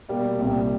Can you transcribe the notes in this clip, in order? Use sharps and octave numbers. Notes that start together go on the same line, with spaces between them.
B2 G3 A#3
C2 A#2 G3